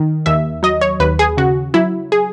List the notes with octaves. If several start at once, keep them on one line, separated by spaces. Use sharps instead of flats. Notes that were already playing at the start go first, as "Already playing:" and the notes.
Already playing: D#3
D#2 E5
F#3 D#5
C#5
D#2 B4
G#4
C#3 F#4
F#3 E4
G#4